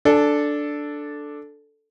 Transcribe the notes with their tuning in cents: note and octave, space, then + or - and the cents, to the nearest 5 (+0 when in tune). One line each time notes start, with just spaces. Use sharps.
D4 +0 A4 +0 G#5 +30